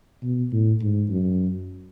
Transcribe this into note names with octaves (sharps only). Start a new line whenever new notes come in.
B2
A2
G#2
F#2